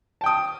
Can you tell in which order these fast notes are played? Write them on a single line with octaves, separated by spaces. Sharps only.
A5 G5 D#6